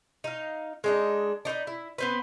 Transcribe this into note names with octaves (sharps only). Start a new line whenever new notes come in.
D#4 F5
G#3 D4 D#4
D4 D#4 B4 D5
E4
B3 C4 B4